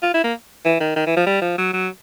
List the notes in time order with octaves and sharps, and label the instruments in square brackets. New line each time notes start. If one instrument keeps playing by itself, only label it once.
[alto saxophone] F4
E4
A#3
E3
D#3
D#3
E3
F3
G3
F3
F#3
F#3